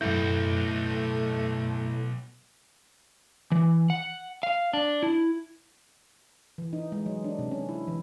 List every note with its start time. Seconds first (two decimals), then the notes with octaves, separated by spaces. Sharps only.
0.01 B1 F#2 A2 A3 E4 F#4 G6
3.52 E3
3.90 F#5
4.43 F5
4.73 D4
5.03 E4
6.58 E3
6.73 D#4
6.92 G#3
7.06 F#3
7.24 D4
7.39 C3
7.51 C#4
7.69 E4
7.87 E3